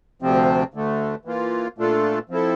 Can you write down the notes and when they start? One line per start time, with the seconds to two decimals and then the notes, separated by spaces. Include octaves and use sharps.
0.22 D2 C3 F3 C4
0.74 D2 D3 A3
1.25 E3 A#3 F4
1.78 A#2 A3 D4 F4 A4
2.30 F3 C4 E4 A4